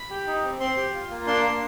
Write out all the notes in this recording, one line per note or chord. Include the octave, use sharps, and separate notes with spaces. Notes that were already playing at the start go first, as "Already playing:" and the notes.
Already playing: B5
G4
D#4
C4
C4 C6
G4
F4
A#3
D4 C6
A#3